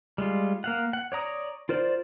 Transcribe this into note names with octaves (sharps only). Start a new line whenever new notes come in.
G3 G#3 F4
A#3 F5 F#5
F#5
C#5 D5 A#5 D#6
F4 A#4 C5 D5